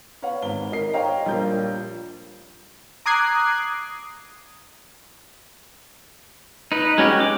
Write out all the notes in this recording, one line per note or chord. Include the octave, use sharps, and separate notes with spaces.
B4 C#5 F5 F#5
G#1 G7
D#4 A#4 C7
C5 C#5 D#5 F5 G5 A#5
A#1 G3 F4 A#4 G6
A#5 D6 D#6 F#6 G#6 C7
D#4 B4
G#3 C#4 F#4 G4
D6